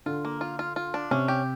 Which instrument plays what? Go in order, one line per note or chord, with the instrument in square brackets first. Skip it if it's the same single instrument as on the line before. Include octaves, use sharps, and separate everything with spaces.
[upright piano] D3 [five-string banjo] F4
[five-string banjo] A#3
F4
F4
F4
D4
[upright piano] C3 [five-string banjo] C#4
[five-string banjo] G4